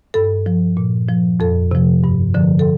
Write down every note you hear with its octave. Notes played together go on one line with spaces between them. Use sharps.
G2 A4
F3
A#2
F3
F2 A4
C3 F3
G2
D3 F3
A4